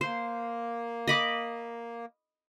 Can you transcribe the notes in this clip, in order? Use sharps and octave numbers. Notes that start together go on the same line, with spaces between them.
A#3 C5
D#5 B5 D6